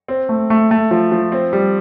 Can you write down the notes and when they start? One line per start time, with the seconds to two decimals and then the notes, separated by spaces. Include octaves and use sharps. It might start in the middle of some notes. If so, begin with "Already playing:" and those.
0.08 C4
0.29 A3
0.50 A3
0.71 A3
0.91 F3
1.12 F3
1.32 C4
1.53 G3